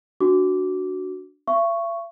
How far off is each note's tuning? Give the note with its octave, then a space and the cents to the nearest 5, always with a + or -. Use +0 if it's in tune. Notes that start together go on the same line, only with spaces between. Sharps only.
D4 +0 F#4 +0 D6 -10
E5 +45 C#6 +0